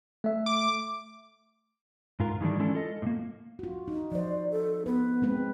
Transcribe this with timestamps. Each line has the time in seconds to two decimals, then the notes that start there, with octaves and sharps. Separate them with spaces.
0.24 A3 E5
0.46 D6
2.20 G#2 F4 A#4
2.41 D#3 E3 G3 A3 D4
2.59 G#3 C#4 D4 E4 A4
2.74 F4 A4 D#5
3.02 A2 A#3
3.59 F4 F#4
3.88 D#4
4.12 F3 C5 D5
4.51 A4
4.86 B3 B4
5.22 G#3 C4 B4